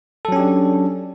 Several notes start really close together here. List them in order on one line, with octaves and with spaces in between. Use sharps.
A4 F#3 C#4 G4 D4